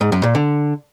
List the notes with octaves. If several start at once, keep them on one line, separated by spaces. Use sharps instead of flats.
G#2
F#2
A#2
D3